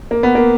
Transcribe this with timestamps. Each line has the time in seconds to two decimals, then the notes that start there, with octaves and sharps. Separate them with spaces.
0.11 A#3
0.23 B3
0.35 A#3